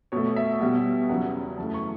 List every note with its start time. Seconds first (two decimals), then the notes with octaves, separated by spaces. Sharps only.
0.12 B2 A3 C#5
0.36 E5
0.61 B2 G3 B3
1.09 E2 C#3 F#3 F#5
1.58 F#2 E3 A3 A5
1.74 C#6